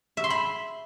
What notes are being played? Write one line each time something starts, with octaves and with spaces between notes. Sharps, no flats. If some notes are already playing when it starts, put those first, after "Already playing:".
E5
C6
B5